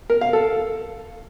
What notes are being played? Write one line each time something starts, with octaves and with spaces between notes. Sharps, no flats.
A#4
F5
A4